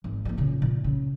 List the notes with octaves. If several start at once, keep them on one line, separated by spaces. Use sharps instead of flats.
G#1
G3 A#3
A#2 C#3
A#2
C#3